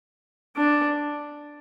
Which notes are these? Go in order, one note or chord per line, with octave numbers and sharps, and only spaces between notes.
D4